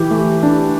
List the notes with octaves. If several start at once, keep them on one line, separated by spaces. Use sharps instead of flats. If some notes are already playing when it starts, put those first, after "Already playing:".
Already playing: E3 G4
A3
D4